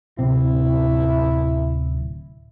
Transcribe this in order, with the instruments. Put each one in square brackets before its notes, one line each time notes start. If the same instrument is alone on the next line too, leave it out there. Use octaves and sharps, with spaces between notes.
[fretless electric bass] D1 C3 C4 [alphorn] E4